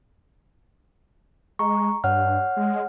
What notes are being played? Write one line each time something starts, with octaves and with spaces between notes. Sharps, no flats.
G#3 A#5 C#6
G2 C#5 F#5 F6
G#3